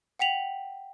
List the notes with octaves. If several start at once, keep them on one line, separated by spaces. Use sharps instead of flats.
F#5 G5 B6 F7 F#7